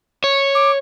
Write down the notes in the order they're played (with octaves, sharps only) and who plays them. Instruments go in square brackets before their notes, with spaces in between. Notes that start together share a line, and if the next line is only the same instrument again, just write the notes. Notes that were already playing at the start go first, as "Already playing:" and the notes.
[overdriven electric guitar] C#5
[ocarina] D6